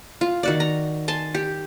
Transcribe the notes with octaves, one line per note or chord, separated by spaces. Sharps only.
F4
D#3 F#4 D5
A#5
G#5 A5 C6
G4